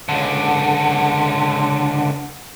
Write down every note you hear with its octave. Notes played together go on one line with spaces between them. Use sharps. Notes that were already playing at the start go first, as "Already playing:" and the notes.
C#2 D3